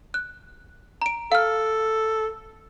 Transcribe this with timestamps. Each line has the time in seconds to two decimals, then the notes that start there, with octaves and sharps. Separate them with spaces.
0.14 F#6
1.02 A#5 D7
1.32 A4 F5 F6